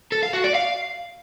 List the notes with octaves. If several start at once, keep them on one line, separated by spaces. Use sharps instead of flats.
A4
F5
F#4
D5
F5